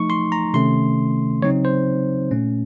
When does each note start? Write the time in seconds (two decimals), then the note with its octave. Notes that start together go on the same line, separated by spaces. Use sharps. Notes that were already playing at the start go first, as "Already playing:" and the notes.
Already playing: F3 A3 D#4 C#6
0.10 C6
0.32 A#5
0.54 C3 D#3 A3 C#4 C6
1.42 C#3 F#3 C4 D#4 C#5
1.65 C5
2.31 A#2 A3 C#4